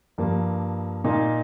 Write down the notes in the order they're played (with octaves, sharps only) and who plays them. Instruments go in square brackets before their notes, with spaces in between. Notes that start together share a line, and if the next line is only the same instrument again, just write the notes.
[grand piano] G2 F3 A#3
A#2 A#3 D#4